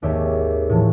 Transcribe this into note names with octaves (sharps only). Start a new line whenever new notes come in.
G#1 D#2 G4 C#5 E5
A2 E3 F3